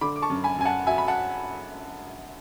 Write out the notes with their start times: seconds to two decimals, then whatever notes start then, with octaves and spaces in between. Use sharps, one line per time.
0.01 D3 B5 D6
0.16 D6
0.22 A5 C#6
0.30 F#2
0.44 G#5 B5
0.58 F#2 G#5
0.65 F#5 A5
0.87 F#3 E5 G#5
0.98 B5
1.08 F#5 A5